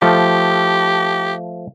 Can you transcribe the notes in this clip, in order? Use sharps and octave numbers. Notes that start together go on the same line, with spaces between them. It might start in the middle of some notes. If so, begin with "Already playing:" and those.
F3 A3 G4